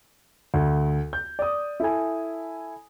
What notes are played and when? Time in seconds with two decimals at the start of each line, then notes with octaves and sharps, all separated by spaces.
0.54 D2
1.13 G6
1.39 D5 D#6
1.80 E4 A4 G#5